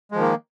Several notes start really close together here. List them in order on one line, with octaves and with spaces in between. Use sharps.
G#3 F3 D#3 A#3